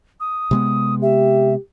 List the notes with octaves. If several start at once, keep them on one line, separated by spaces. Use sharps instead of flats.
D#6
C3 G#3 B3
G4 E5